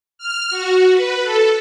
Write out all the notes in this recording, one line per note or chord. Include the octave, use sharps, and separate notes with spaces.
F6
F#4
B4
A4